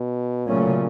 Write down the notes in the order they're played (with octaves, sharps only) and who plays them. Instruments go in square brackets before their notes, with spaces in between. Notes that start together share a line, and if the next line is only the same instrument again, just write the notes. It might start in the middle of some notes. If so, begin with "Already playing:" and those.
Already playing: [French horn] B2
[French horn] A#2 [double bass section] C#3 F#3 A3 C#4